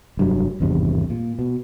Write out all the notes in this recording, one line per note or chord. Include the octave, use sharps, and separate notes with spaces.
F1 G2 F#3
G#1 E2 G2 C3
A#2
B2